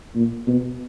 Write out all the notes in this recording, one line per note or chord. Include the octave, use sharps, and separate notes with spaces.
A#2
B2